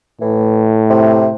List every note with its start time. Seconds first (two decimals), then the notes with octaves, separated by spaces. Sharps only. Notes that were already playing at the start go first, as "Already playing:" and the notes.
0.21 A2 E3
0.90 C3